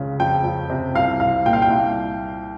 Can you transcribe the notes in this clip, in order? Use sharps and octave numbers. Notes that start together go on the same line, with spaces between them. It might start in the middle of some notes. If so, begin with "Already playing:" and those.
Already playing: C#2 C#3
F2 G5
F2
C3
C2 F5
C2 F5
A#2 G5
F5
G5
C2